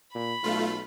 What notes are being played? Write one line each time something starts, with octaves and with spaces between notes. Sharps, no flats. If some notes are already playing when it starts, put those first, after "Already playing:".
A#2 B5
B1 A3 F4